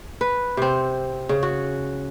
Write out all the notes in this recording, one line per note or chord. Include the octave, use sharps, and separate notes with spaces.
B4
C3 C4
C#3
F#4